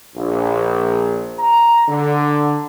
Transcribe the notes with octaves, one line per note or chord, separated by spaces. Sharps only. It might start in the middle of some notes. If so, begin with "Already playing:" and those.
A#1
A#5
D3